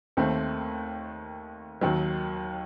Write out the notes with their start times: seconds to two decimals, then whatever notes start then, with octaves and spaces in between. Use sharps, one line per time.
0.17 D#2 D#3 A3 C4
1.81 D#2 D#3 F#3